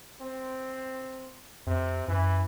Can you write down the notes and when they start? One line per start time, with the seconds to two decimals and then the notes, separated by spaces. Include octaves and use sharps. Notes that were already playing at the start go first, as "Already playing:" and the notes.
0.21 C4
1.67 F2 C3
2.08 F#2 E3